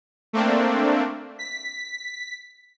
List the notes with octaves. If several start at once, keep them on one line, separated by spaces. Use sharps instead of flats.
A3 A#3 C4 D4
B6